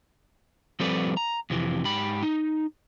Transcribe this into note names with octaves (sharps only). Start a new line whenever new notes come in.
F3 G3 C4 A4 B4 D5
A#5
F2 C3 E3
G#2 G4 B5
D#4